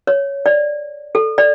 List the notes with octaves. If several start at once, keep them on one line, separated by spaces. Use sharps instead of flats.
C#5
D5
A4
D5